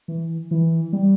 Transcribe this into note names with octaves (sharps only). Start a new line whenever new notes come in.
E3
E3
G3